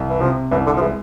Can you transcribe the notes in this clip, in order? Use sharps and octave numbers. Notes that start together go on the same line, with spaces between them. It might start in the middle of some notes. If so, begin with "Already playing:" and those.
Already playing: C2
E3
C3 F3
C2 E3
D3
F3
E3 G#3